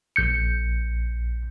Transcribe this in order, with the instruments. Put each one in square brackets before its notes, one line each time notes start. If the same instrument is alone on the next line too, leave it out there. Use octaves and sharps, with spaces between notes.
[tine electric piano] A#1 G6 C#7